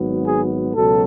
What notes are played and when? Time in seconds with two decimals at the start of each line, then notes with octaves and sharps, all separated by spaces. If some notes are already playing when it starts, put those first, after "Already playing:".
Already playing: G#1 G#2 F#3 B3
0.27 G#4
0.75 C#2 B2 F#3 A4